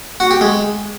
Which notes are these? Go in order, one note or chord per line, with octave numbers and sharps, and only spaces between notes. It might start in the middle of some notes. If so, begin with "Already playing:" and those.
F#4
G4
G#3